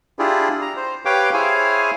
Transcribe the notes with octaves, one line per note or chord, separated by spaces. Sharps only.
D4 E4 F4 G4 G#4
A#5
C5
G4 B4 C#5 F5 G5 D6
E4 G#4 C5 C#5 F5 G#5